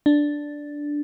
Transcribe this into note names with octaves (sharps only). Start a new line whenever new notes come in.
D4